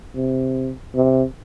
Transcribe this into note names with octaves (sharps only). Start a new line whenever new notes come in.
C3
C3